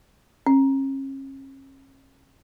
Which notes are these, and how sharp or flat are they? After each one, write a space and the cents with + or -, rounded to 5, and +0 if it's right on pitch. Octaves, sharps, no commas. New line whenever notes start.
C#4 -40